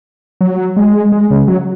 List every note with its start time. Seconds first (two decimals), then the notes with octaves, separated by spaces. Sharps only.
0.41 F#3
0.77 G#3
1.12 G#3
1.31 C#3
1.48 F#3